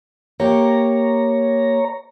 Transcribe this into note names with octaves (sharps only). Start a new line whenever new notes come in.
A#3 G4 C#5 A#5